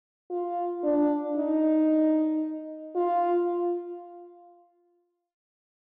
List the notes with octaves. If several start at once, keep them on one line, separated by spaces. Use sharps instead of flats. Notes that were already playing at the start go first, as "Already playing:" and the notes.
F4
D4
D#4
F4